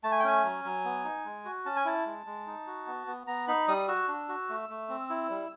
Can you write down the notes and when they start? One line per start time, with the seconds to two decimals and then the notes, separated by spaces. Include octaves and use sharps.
0.04 A3 A5
0.12 G#5
0.20 G5
0.24 C#4 G#5
0.44 F#3
0.65 F#3
0.85 B3
1.04 D#4
1.25 G#3
1.45 F#4
1.65 C#4 A5
1.76 G#5
1.85 E4 A5
2.06 G#3
2.26 G#3
2.47 D#4
2.67 F#4
2.87 B3
3.07 B3
3.27 B3 A#5
3.48 D#4 B5
3.68 G3 D#6
3.88 F#4 E6
4.08 D4
4.29 F#4
4.49 A3
4.69 A3
4.89 C4
5.10 E4
5.30 G3